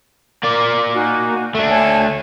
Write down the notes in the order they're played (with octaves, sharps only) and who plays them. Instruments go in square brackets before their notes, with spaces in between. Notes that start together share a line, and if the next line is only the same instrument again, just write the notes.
[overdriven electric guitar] A#3 D5
[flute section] D#4 F#4 G#5
[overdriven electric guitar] A3 D4
[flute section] C#5 G#5 A5